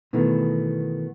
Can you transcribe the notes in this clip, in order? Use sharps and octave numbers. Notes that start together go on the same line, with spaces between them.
B2 D#3 E3 A3 B3